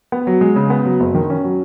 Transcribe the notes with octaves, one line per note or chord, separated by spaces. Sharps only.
B3
F#3
G#3
C#3
B3
F#3
F#1
D#3
C#4
F#3